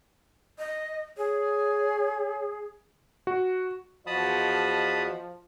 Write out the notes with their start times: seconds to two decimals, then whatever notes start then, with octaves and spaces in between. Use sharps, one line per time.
0.59 D#5
1.18 G#4 C#5
3.27 F#4
4.07 E2 F3 F#4 D#5 A5 B5 D#6